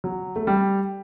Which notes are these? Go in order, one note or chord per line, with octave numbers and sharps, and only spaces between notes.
F#3
A3
G3